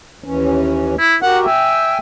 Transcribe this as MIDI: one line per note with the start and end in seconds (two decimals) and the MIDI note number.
0.24 0.95 39
0.24 0.95 52
0.24 0.95 61
0.99 1.16 64
1.22 1.46 66
1.22 1.46 67
1.22 1.46 70
1.22 1.40 78
1.46 1.97 76
1.46 1.98 79
1.46 1.98 80